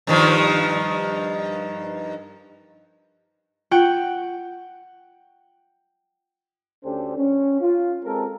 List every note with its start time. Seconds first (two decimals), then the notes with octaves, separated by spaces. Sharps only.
0.07 G2 D#3 F3
3.72 F4 F#5 G5
6.84 D2 C#4 D4 G4 A4 C5
7.17 C#4
7.61 F4
8.04 G#3 C4 G4 A4 A#4